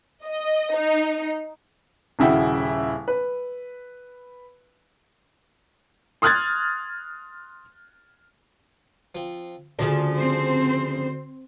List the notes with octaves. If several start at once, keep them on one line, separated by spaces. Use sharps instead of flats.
D#5
D#4
D#1 C#3 E4 F#4 G5
B4
C6 D#6 F6 F#6 G#6 A6
F3 C4
D2 C#3 F3 D4
C4 C5